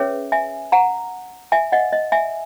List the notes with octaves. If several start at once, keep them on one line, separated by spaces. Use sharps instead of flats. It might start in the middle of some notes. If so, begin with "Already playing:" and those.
Already playing: C#4 G#4 B4 C#5 E5
E5 G#5
F#5 A#5
E5 G#5
D#5 F#5
D#5
E5 G#5